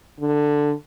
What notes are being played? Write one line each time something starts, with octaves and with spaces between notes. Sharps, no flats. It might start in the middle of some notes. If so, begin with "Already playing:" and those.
D3